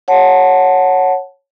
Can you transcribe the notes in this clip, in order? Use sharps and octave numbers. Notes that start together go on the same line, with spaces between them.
C#5 F#5 A5